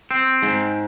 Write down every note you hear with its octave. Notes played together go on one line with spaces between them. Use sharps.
C4
G#2